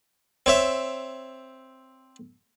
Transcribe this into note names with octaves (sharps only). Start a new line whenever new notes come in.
C4 C#5 E5